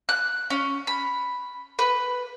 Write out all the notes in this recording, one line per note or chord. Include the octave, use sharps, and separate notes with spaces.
F#6
C#4
B5
B4